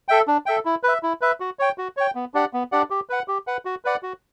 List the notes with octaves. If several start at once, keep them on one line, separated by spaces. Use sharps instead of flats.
A4 E5 G5
D4
A4 E5 G5
E4
B4 E5
E4
B4 E5
F#4
C#5 G5
F#4
C#5 G5
B3
D4 G4 D5 F#5
B3
D4 G4 D5 F#5
G4
B4 F#5
G4
B4 F#5
F#4
B4 D5 F#5
F#4